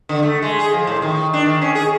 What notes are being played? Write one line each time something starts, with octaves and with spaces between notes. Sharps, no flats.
D3
A3
G#3
G#4
F3
A2
D#3
D4
D#3
C#4
G#4